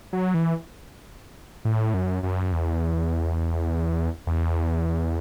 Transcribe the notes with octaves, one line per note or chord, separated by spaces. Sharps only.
F#3
E3
A2
F#2
F#2
E2
E2